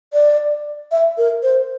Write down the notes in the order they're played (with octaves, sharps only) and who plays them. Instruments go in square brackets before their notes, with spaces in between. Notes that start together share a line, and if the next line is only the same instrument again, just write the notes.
[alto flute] D5
E5
A#4
C5